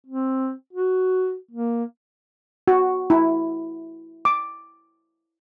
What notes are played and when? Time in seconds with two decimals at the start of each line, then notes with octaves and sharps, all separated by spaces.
0.07 C4
0.73 F#4
1.51 A#3
2.68 F#4
3.10 E4
4.25 D6